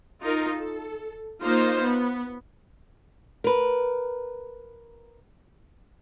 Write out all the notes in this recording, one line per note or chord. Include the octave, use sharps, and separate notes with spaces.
D#4 F4 A#4
A4
A#3 D#4 F4 C5
B3
A#4 B4